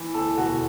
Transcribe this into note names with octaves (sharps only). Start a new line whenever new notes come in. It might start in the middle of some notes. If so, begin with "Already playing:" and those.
Already playing: E3
D2 A4
E1 F#4